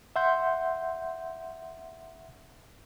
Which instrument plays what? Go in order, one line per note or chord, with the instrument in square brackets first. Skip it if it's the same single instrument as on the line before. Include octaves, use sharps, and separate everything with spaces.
[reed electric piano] E5 F#5 C6 G6